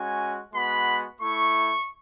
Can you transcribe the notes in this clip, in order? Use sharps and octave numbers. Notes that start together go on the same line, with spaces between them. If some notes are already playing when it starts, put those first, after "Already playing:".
Already playing: G#3 C#4 F#4 G#5
G#3 B3 F#4 B5
A3 E4 C#6